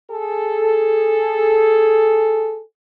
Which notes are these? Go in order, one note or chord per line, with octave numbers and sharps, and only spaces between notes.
G#4 A4